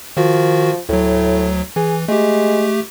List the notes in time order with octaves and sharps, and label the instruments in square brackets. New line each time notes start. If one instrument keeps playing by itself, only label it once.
[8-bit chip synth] D#3 F#4 [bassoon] F3
[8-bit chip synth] D2 F#3 [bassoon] A2
[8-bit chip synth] E3 [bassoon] G#4
[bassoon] G#3 [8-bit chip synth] A3 G4